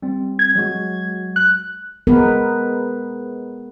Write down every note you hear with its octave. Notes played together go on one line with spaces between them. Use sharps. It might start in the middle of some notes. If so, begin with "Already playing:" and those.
G3 C4
G#6
F#3 G#3 F#4
F#6
G#3 B3 A#4 B4